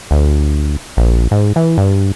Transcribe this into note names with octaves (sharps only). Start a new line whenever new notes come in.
D2
A#1
G#2
E3
G2